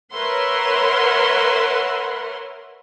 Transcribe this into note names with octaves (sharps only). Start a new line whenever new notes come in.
A#4 B4 C#5 E5 F#5 C6